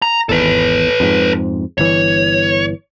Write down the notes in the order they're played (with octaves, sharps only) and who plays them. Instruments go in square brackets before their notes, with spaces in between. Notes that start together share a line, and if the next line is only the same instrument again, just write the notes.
[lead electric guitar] A#5
[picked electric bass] G#1 E2 [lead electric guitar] A4 B4
[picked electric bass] F2 G#2
[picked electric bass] G1 E3 [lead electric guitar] C#5